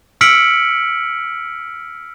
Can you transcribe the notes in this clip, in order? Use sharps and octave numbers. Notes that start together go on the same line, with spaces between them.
E6 F6 B6 C#7 D7 F#7